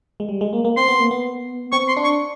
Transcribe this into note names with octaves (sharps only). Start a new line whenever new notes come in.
G#3
G3
G#3
A#3
A#3
C4 C6
B3
A#3
B3
C4 C#6
C6
D4
C#6